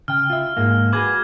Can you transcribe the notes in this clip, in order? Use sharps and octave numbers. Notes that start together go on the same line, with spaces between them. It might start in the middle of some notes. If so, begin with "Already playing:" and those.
C#3 G5 F6
F4 E5
G#2 G#3 A#3
F#4 G#4 B4 D6 G#6